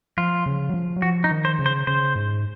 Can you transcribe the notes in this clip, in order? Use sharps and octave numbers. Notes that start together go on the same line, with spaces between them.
F3 F4
C#3
F#3
F3
F#3
F3 F#4
D#4
D#3
C5
C#3
C5
C#3 C5
G#2